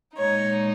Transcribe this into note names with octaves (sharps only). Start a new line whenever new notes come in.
A#2 G#3 D#4 C#5